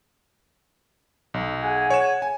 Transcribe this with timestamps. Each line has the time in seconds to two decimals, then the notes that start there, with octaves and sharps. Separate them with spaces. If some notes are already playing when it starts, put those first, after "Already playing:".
1.34 B1
1.62 G#4 F#5 G#5
1.90 C#5 E7
2.22 G#5